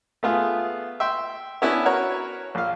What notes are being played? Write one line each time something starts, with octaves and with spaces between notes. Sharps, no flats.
A3 B3 F4 G#4
E5 G5 C6
B3 C#4 D4 E4 B4
F#4 A#4 B4 C#5 A#5
A#1 F5